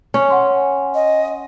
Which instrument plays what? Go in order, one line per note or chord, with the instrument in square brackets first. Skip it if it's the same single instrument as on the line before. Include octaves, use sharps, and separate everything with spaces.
[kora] C#4
[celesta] F#5 G#5 C6
[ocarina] D#5